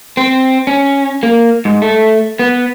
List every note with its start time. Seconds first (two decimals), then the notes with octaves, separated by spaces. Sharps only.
0.17 C4
0.67 C#4
1.23 A#3
1.65 G#2
1.82 A3
2.39 B3